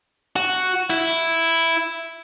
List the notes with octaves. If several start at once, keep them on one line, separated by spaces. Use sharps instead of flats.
F#4
E4